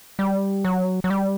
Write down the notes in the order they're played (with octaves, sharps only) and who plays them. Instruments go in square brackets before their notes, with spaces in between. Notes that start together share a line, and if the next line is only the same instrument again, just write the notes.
[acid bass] G3
F#3
F#3
G3